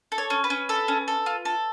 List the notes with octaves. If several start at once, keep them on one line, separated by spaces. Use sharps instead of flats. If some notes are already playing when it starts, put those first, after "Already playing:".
A4
C#5
C#4
B4
C#4
A4
C#4
A4
F4
A4